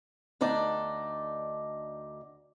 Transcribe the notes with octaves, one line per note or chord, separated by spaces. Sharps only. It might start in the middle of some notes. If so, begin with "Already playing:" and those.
D2 D4 D#4 D5